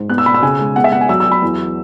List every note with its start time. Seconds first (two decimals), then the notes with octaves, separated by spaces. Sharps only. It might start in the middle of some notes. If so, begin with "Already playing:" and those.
Already playing: G#2
0.09 B3 F#6
0.18 E6
0.26 B2 B5
0.34 E6
0.42 C#3 G#5
0.59 G#3
0.76 B3 F#5
0.84 E5
0.92 B3 F#5
1.01 G#5
1.09 F#3 E6
1.20 E6
1.26 F#3
1.32 B5
1.42 E2